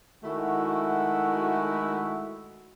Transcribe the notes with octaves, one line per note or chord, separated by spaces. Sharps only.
D#3 G#3 A3 E4 F#4